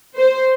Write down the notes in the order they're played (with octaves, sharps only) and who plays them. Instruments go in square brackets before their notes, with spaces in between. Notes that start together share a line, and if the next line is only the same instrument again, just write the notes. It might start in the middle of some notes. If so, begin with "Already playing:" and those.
[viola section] C5